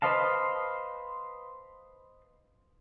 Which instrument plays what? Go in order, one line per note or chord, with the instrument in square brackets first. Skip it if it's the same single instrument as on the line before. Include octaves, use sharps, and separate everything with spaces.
[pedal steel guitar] B4 C5 D#5 F5 A5